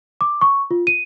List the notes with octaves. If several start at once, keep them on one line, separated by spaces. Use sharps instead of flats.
D6
C#6
F4
D#7